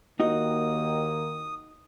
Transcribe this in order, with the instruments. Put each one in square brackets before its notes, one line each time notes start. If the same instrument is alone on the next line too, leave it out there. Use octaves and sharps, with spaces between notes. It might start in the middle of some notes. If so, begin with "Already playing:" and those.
[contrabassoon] D#2 [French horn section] D#3 A#3 [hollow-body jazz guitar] D#4 F#4 D#5 [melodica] D#6